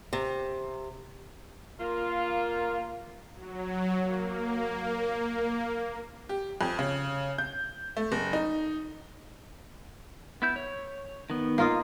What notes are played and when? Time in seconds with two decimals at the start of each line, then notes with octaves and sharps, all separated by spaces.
0.13 C3
1.80 A#3 F4
3.34 F#3
4.00 A#3
6.29 G4
6.61 F2
6.79 C#3
7.38 G6
7.97 A3
8.12 F#1
8.33 D#4
10.42 B3 E4 G6
10.56 C#5
11.30 D#3 B3
11.58 A#3 F4 D#5